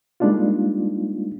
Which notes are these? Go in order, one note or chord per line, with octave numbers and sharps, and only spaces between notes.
G3 G#3 A#3 D4 D#4 F4